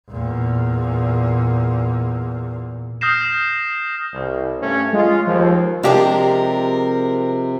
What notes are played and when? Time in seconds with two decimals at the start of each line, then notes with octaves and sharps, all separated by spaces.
0.10 E2 A#2
3.01 D#6 F6 G6 A#6 C7 E7
4.12 C2
4.61 G2 A3 C#4
4.93 G#3 F4
5.27 D#2 F3
5.83 C3 F3 G#3 C4 D4 G4 A#4 A5